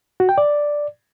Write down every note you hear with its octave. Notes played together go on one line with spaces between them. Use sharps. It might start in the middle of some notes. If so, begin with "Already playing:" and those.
F#4
G5
D5